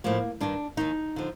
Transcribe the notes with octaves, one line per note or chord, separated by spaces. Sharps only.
A2 F3 A#3
G2 D#3 D4
D#2 D#3 D#4
D3 F3